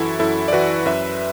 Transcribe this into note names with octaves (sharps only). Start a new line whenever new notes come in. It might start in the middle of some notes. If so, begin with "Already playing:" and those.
Already playing: F#2 E3 E4 F#4 A4
F#2 E4 A4
D5
E3 F#4 B4
F#2 B4 E5